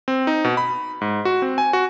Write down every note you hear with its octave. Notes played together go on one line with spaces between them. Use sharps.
C4
D#4
B2
B5
G#2
F#4
C4
G#5
F#4